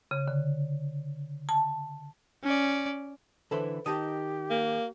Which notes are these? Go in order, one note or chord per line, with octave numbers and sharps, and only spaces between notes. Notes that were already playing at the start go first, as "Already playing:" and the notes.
C#3
D3
A5
C#4 D5
D3 E3 E4 A4 B4 C5
D#3 D#4 G4 A5 D#6
A#3